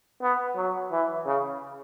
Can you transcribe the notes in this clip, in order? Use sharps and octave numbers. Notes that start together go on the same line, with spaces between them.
B3
F#3
E3
C#3